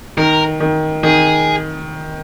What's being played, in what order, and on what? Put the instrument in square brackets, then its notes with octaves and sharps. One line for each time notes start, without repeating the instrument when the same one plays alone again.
[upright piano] D#3 [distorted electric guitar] A#4
[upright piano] D#3
[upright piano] D#3 [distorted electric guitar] G#4